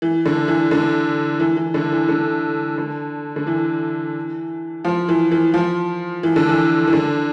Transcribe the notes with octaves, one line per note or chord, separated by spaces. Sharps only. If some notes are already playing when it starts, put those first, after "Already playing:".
E3
D3
E3
D3
E3
E3
D3
E3
D3
D3
D3
E3
F3
E3
E3
F3
E3
D3
E3
E3
D3